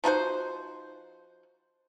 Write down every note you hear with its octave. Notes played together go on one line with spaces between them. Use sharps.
F3 D#4 F#4 C5